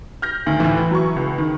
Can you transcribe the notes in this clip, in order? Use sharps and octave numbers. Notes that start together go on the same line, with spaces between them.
F6 G6 A#6
D2 D#3
D2 A2 E3
F#3 C#6
C#2
D#3